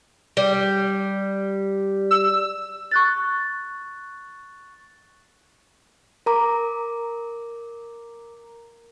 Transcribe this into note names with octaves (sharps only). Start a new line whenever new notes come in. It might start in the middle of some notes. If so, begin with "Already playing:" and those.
G3
E6
C#6 F#6 A6
A#4 A#5 D6